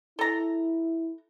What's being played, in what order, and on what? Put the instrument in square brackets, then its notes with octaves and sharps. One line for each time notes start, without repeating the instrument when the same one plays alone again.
[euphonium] E4 [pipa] A4 A#5